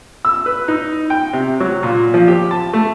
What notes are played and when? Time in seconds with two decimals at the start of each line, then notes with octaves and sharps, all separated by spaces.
0.25 E6
0.46 B4
0.68 D#4
1.10 G5
1.33 C3
1.60 F#3
1.83 A#2
2.14 F3
2.28 G4
2.51 A5
2.73 A3